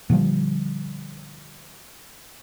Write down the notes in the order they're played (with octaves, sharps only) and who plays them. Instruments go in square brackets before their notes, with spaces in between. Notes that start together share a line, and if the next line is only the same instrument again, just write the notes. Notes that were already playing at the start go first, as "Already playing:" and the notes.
[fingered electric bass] A#2 D3 F3 G3